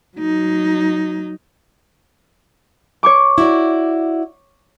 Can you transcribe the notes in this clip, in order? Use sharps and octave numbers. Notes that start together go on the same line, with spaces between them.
F#3 D#4
C#5 C#6 D6
E4 F#4 D5